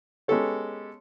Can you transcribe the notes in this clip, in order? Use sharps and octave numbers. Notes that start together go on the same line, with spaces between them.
G#3 B3 C#4 G4 A4 C#5